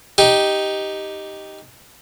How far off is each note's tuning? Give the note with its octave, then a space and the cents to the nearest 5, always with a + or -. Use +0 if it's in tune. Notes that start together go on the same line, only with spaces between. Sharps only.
D#4 +0 G4 +0